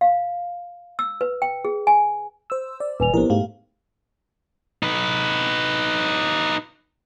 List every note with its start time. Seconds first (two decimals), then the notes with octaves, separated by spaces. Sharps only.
0.01 F5
0.99 E6
1.21 B4
1.42 G5
1.65 G#4
1.87 G#5
2.50 C5 E6
2.80 D5
3.00 D#1 B4 G#5 F7
3.14 A#1 B3 E4 G4 A#4 C5
3.30 G#2 A3 G4 F5
4.83 D#4 B4